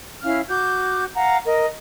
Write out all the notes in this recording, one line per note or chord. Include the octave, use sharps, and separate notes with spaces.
C#4 E4 F5 F6
F#4 D6 G6
F5 F#5 A#5
A#4 D#5